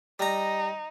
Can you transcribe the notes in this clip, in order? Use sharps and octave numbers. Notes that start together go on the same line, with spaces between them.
G3 D#4 A#5